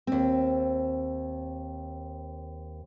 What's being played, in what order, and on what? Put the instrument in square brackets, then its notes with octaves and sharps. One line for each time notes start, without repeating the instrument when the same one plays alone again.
[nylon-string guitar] D#2 C4